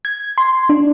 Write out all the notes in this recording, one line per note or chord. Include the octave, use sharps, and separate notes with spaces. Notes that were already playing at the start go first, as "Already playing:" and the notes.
G#6
C6
D4